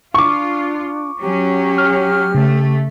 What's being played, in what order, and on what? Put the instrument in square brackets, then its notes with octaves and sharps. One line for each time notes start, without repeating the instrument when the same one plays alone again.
[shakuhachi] D4 [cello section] F4 [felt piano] C#6 D6
[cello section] F#3 C#4 [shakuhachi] G4
[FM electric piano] F6
[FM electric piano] C#3 [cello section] A3